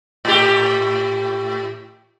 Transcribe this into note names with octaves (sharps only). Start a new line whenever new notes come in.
A2 G4